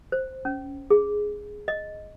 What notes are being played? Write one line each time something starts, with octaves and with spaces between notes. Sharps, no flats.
C5
C#4
G#4
D#5